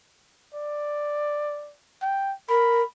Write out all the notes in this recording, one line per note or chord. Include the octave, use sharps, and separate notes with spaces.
D5
G5
A#4 B5